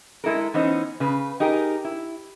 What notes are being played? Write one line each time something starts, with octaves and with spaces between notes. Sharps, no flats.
G#3 E4 A4 A#4
E3 B3 C#4 D#4 C5
C#3 B4
D#4 G4 G#4 A#4
E4